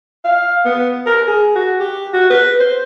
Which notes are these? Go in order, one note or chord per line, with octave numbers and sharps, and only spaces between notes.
F5
B3
A#4
G#4
F#4
G4
F#4
B4
C5